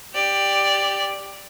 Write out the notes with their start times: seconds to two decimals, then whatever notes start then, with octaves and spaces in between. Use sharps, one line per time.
0.14 G4 D5